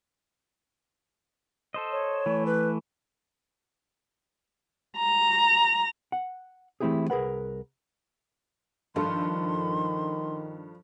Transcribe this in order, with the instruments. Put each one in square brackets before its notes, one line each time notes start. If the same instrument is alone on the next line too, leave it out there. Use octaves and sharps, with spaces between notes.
[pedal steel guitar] A4 C5 D#5
[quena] C#5
[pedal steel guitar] E3 A3
[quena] B4
[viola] A#5
[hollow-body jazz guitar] F#5
E3 A3 C4 E4 G4 G#4
C2 G#4 A#4 B4 F#5
[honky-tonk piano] G2 A4 [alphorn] D#3 [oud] F3 [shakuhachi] C6